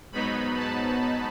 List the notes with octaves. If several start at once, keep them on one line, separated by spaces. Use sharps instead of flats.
G#2 F#3 B3 D#4 B5
A5